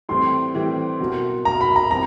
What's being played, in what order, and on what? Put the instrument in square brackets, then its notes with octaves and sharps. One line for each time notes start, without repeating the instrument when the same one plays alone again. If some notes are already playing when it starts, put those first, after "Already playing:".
[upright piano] A2 E3 G3 C4 [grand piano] C6
[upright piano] A2 E3 G3 C4
B2 F#3 A#3
[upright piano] B2 F#3 A#3 [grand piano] A#5
[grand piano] B5
A#5
[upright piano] E3 G3 C4 [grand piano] A#5